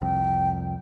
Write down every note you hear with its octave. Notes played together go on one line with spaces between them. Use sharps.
C2 F2 G5